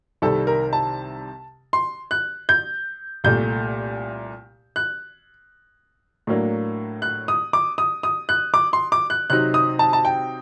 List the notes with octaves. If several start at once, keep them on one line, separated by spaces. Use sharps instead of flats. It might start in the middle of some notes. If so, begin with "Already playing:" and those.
C2 C3 D#3 G3 A4
A#4
A5
C6
F#6
G6
C2 A#2 A3 G6
F#6
A2 F#3 A#3 D4
F#6
D#6
D6
D#6
D#6
F#6
D6
C6
D6
F#6
C3 F#3 C4 D#4 F#6
D#6
A5
A5
G5